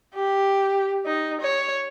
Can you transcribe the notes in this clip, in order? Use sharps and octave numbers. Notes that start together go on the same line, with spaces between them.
G4
D#4
C#5